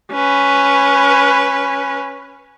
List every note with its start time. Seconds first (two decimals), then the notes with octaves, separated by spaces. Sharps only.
0.13 C#4 B4